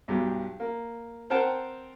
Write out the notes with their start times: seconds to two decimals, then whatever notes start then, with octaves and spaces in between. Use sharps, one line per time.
0.08 B1 G2 B2 G4
0.60 A#3
1.30 C4 A#4 C5 F#5 G5 A5